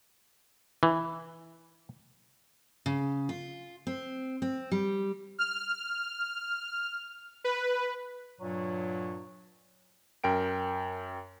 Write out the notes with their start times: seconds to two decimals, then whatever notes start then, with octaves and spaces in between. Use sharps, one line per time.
0.83 E3
2.86 C#3
3.29 F4
3.87 C4
4.42 C4
4.71 G3
5.39 F6
7.44 B4
8.39 G2 A#2 F#3
10.24 F#2 A#4 G5 D7